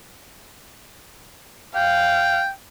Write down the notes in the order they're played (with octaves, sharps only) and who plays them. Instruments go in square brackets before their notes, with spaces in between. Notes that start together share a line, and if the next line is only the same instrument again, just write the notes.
[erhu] F5 [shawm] G5